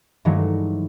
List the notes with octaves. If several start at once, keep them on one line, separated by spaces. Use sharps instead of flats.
G2 D#3 E3 F#3 G#3 A3